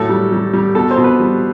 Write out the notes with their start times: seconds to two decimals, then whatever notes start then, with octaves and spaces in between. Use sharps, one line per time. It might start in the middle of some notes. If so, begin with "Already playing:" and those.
Already playing: A2 F#3 A4
0.09 G3
0.32 G3
0.53 G3
0.75 B2 A4
0.91 C5
0.97 B2
1.04 B4
1.20 G3